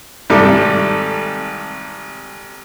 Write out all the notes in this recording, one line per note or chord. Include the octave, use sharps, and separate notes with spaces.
G#1 C3 G3 A3 A4 D6